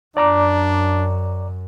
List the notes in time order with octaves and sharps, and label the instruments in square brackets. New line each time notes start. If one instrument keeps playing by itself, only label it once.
[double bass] F#2 [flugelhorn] D4 [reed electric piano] D5 A#5 D6